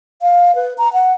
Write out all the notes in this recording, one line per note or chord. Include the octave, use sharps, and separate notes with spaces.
F5
B4
A#5
F#5